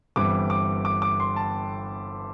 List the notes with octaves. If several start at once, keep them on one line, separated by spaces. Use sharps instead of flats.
G1 G2 E3 G3 C4 D6
D6
D6
D6
C6
A5